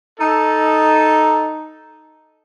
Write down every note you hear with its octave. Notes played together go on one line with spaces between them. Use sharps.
D#4 A4